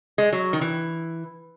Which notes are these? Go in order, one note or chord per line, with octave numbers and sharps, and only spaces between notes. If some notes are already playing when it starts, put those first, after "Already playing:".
G#3
F#3
D#3
E3